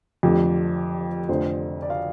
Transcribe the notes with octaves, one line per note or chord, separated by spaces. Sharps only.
F1 F2 D3 F3 G4
F1 F2 D3 F3 C5
D5
F5